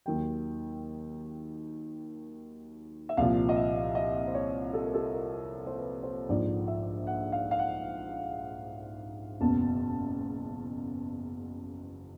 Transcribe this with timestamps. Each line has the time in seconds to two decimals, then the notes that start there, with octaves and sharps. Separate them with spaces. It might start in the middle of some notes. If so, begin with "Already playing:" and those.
0.06 D#2 D#3 F#3 G5
3.09 E5
3.17 C2 A#2 F3 F5
3.49 D#5
3.56 E5
3.95 D#5
4.27 C5
4.34 C#5
4.74 A4
4.84 A#4
4.94 A4
5.12 A#4
5.67 C5
5.77 B4
6.03 C5
6.29 A#1 G#2 F3 D5
6.68 E5
7.07 F#5
7.32 F5
7.51 F5
7.59 F#5
9.41 F#1 E2 B2 A5